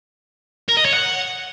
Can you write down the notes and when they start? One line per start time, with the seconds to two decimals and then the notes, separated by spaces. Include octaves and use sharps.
0.68 A#4
0.77 D#5
0.85 C#5
0.94 F#5